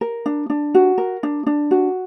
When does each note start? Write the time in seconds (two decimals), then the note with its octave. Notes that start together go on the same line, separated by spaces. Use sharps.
0.01 A#4
0.26 D4
0.50 D4
0.74 F#4
0.98 A#4
1.23 D4
1.46 D4
1.71 F#4